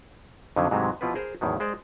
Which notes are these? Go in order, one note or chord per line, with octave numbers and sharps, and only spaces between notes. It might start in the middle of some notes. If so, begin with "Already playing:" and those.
F2 D3 D#3 F#3
G#2 C3 E3 F#3 G#3 A3
B2 F3 E4 F4 G4 B4
G#4 A#4 C5
E2 A2 D#3 F#3
G#3 C5 D5